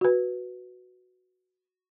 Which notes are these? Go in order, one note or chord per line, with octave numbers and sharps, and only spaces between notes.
F#4 B4